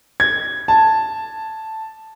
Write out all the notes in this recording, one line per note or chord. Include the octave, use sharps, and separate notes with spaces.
G#6
A5